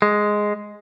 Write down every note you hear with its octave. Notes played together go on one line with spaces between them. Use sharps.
G#3